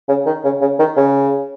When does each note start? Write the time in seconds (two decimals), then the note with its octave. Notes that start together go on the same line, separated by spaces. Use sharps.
0.09 C#3
0.26 D#3
0.44 C#3
0.61 C#3
0.79 D#3
0.97 C#3